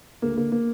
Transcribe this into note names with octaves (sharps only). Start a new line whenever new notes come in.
D2 A#3
D3 A#3
A#3